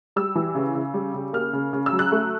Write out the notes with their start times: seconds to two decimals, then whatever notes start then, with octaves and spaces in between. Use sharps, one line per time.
0.16 G3 E6
0.35 E3
0.55 C#3
0.75 C#3
0.94 G3
1.14 C#3
1.33 A#3 F6
1.53 C#3
1.73 C#3
1.86 E6
1.92 F#3
1.99 F#6
2.12 A3